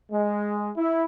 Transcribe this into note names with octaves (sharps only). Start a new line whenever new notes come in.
G#3
E4